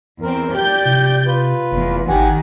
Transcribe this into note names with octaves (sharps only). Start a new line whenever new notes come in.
E2 C4 A#4
G4 D5 G6
C3
F4 B4
F1 E2
G#1 D#3 G4 F#5 G#5